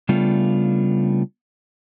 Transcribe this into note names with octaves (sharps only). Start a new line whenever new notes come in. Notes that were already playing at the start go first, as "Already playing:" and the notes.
C#3 G3 A3 B3 D4 F4